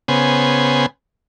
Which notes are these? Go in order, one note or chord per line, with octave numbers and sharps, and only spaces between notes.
C#3 B3 C5 G#5